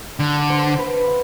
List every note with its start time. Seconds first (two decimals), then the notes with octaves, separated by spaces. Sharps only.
0.19 D3
0.50 C5
0.79 B4
1.08 F#5